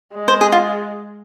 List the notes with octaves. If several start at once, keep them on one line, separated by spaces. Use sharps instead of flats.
G#3
C5
G#4
F4